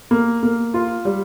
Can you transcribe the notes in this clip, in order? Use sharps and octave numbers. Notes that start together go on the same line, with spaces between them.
A#3
A#3
F4
G3